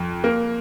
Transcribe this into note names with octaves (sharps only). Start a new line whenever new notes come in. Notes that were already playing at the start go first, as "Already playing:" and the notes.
Already playing: F2
A#3